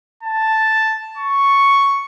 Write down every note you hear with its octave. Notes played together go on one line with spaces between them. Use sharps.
A5
C#6